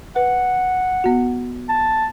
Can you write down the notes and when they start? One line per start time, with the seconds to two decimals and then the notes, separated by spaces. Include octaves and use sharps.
0.16 B4 F#5
1.04 B3 F#4
1.69 A5